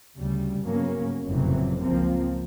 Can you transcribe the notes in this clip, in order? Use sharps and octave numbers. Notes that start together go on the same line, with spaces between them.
D2 C#3 G3
G2 C#3 F#3 A#3 B3 C#4
F#1 F2 A2 C3 E3 F#3
C#2 F3 A#3 C4